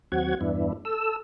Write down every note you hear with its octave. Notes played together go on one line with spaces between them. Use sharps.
D#2 F#3 C4 F#4 F#5 G#6
E2 G2 B3 D4 E4
A4 E6